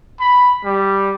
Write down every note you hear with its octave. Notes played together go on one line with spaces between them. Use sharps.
B5
G3